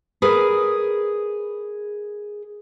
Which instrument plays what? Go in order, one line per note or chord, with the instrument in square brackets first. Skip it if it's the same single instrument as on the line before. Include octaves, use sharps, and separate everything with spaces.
[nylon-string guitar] G#4 A#4 B4